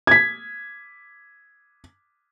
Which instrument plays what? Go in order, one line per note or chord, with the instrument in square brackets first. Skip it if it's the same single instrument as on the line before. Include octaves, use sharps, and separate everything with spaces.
[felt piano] G#6 B6